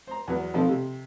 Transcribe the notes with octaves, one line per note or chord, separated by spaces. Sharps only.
C5 A#5
E2 F#3 B3
B2 D#3 F3 C4 A4
C3